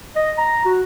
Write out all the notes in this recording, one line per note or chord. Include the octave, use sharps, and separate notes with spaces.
D#5
A#5
F#4